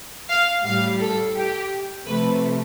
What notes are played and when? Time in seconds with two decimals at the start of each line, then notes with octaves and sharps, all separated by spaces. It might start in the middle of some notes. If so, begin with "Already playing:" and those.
0.29 F5
0.65 A2 G3 F5
1.00 A4
1.36 G4
2.07 C3 F3 A3 B4